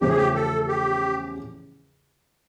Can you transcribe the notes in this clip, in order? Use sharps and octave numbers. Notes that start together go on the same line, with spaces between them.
E2 C#3 F3 A3 C#4 G4
G#4
G4
A4
G4